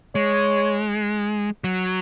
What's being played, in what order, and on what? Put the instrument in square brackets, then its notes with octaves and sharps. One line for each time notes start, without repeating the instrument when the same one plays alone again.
[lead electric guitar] G#3 [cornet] C#5
[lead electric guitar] F#3